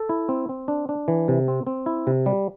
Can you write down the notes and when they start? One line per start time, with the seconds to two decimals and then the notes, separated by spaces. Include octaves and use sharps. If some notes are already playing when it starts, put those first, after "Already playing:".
Already playing: A4
0.09 E4
0.29 C4
0.49 C4
0.68 D4
0.89 D4
1.08 E3
1.28 C3
1.48 C4
1.67 C4
1.86 E4
2.07 C3
2.26 G3